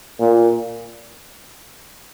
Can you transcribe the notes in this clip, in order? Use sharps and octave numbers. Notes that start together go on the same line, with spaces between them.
A#2